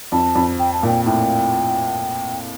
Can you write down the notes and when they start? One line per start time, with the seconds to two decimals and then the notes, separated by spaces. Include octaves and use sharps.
0.12 F2 A5
0.35 F2
0.59 G5
0.73 A5
0.83 A#2 G5
1.06 A2 G5